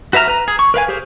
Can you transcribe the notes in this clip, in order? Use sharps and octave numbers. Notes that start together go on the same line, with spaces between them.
F#4 B4 E5 A#5 F6
B4 A#5
G#4
C#6
A#4 B4 F5 G#5
G4 G#4 A#4 C5